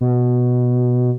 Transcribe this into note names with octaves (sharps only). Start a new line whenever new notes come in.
B2